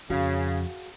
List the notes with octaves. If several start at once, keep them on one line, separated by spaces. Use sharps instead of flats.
F2 C#3 F#4 G#4 F5